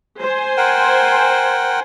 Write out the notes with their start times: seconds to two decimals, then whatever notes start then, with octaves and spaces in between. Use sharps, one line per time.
0.21 C5 G#5
0.57 A#4 F#5 G5